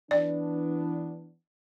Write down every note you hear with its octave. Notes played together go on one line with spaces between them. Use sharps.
E3 B3 D4 D5